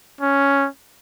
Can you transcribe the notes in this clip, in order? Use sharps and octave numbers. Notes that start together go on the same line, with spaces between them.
C#4